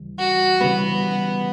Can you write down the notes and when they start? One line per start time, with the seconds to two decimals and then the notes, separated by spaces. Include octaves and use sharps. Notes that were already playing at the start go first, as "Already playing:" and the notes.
Already playing: D2 C#3 E3 G3
0.19 F#4
0.61 C#3 E3 G3 B3